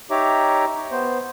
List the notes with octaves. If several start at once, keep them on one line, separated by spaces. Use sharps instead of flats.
D#4 G4 C#5 E5 A#5 D6
B3 C5